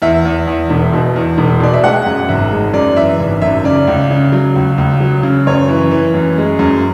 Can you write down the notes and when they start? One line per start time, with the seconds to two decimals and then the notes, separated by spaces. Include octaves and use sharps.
0.02 E2 E5
0.25 E2
0.47 E2
0.70 E1
0.93 B2
1.16 E2
1.38 E1
1.60 B2 D5
1.74 E5
1.84 G#3 F#5
2.06 F#2
2.29 G#1 E5
2.52 G#3
2.73 F#2 D5
2.97 E3 E5
3.20 G#1
3.42 F#2 E5
3.64 C#3 D5
3.87 C#2
4.11 C#3
4.32 F#3
4.56 C#2
4.78 C#2
5.00 F#3
5.23 C#3
5.47 F#2 C#5
5.68 E3
5.91 E3
6.14 F#2
6.38 G#3
6.59 F#2